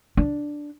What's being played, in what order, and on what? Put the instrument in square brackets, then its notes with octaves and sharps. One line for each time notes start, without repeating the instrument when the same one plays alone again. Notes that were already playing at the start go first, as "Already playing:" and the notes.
[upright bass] D4